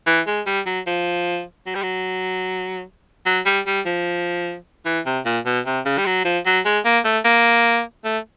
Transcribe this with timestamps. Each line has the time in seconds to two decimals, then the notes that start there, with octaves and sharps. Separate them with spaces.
0.06 E3
0.27 G#3
0.46 G3
0.66 F#3
0.87 F3
1.66 F#3
1.75 G3
1.82 F#3
3.26 F#3
3.46 G3
3.66 G3
3.86 F3
4.85 E3
5.05 C3
5.25 A#2
5.45 B2
5.66 C3
5.85 C#3
5.98 G3
6.06 F#3
6.24 F3
6.45 F#3
6.65 G#3
6.85 A#3
7.04 A3
7.25 A#3
8.04 A3